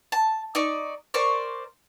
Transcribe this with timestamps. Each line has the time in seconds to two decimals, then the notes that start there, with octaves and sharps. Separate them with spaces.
0.12 A5
0.55 D#4 D5 C#6
1.14 A#4 C5 D5 C#6